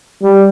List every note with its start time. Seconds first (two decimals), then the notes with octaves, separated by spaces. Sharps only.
0.22 G3